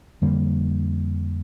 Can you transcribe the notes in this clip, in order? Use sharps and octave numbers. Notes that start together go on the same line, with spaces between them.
F2 D3 G3 A#3